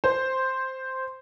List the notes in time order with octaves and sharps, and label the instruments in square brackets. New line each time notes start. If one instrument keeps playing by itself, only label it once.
[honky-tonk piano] C5